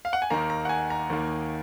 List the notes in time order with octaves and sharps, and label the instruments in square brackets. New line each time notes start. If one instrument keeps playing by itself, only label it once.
[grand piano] F5
F#5
G#5
D#2 D#3 A#3 A#5
A#5
F#5
G#5
A#5
D#2 D#3 A#3